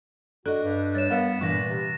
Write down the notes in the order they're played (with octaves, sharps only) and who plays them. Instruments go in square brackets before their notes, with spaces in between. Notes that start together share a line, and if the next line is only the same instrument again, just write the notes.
[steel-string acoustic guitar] D4 D#5 [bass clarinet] F#4 [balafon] A4 [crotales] F#6
[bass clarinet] G2
[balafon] G3 C#5 [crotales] A6 E7
[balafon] G3 A#4 F5 [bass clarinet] B3
[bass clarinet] G2 [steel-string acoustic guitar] A#2 E3 B4 [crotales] C#6 A#6
[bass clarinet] C3